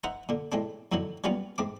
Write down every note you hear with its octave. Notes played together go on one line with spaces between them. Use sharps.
D#4 C5 E5 F#5 A#5
A#2 D3
A2 G#3 C4 D4
F2 A2 D3 D#3 F#3
F#3 G3 A#3 B3 C#4 F4
G#2 C4 D6